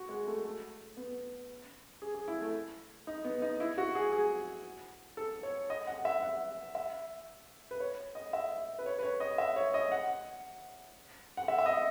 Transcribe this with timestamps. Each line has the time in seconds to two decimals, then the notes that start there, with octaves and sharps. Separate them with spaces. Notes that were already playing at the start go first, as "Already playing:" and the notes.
Already playing: F#4
0.09 G#3
0.27 A3
0.44 A3
0.97 B3
2.02 G#4
2.15 G#4
2.28 E4
2.41 A3
3.07 D#4
3.24 B3
3.42 D#4
3.60 E4
3.78 F#4
3.95 G#4
4.12 G#4
5.17 A4
5.43 C#5
5.70 D#5
5.87 F#5
6.05 E5
6.22 F#5
6.75 E5
7.71 B4
7.80 C#5
8.15 D#5
8.33 E5
8.79 B4
8.86 C#5
8.99 B4
9.03 C#5
9.20 D#5
9.38 E5
9.56 C#5
9.74 D#5
9.92 F#5
11.37 F#5
11.48 E5
11.58 E5
11.66 D#5